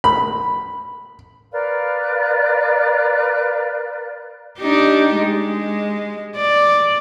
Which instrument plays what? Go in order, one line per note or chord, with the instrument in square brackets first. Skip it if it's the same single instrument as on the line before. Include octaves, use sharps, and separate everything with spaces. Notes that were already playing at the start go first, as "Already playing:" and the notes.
[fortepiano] B5
[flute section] A#4 B4 D5 F5
[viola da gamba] D4 D#4 G4
G#3
D5